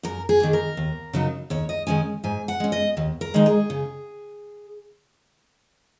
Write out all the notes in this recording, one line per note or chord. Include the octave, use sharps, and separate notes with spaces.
F#2 A#4
G#4
D#3 A#3
A#4
D#2
C#3 F#3 D#4
D#2 C#5
D#5
D#3 G#3 C#4 G#5
G#2 G#5
F#5
G#3 C#4
D#5
D#2
A#4
D#3 G#3 D#4
G#4
C#3